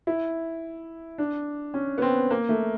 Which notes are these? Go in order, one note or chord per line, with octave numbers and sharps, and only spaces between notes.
E4
D4
C#4
B3
C4
A#3
A3